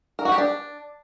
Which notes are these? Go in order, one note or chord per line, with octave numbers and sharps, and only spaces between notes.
A#4
F#4
G4
D4